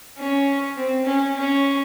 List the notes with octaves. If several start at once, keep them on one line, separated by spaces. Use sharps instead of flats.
C#4
C4
C#4
C#4